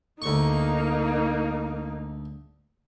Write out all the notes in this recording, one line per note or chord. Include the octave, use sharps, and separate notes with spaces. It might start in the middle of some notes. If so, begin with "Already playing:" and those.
D2 A#3 D#4 C#6